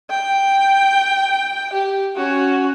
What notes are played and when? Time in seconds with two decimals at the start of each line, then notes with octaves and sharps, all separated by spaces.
0.10 G5
1.73 G4
2.16 C#4 F#4